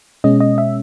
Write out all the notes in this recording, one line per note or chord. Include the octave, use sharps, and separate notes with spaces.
B2 G#3 C#4 D#5
D#5
E5